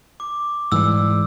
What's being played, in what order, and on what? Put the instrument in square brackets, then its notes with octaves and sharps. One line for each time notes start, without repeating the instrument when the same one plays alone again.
[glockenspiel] D6
[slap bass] G#2 E3 G3 [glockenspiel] E6